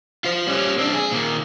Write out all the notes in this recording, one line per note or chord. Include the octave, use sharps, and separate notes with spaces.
F4 C5
G3 C#4
C4 D4
G#4
A#2 D#3